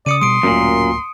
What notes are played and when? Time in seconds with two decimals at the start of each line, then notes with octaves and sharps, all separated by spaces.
0.06 C#3 D5 D#6 C#7 D#7
0.21 B2 G3 C6 D#6 D7
0.43 D1 F#2 A#2 A3 A#3